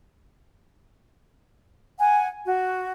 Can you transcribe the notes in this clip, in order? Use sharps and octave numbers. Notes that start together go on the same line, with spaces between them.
F#5 G#5
F#4